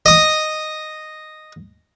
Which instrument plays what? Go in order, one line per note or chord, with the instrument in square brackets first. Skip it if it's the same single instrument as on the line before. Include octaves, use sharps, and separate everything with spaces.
[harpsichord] D#5 D#6